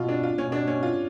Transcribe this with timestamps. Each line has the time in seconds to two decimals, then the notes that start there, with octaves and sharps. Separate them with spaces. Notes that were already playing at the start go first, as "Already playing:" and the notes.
Already playing: B2 F4
0.09 D4
0.23 F4
0.38 B2 C#4
0.52 D4
0.67 C#4
0.83 F4